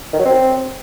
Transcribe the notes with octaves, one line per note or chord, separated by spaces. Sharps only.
D#3
F#3
C4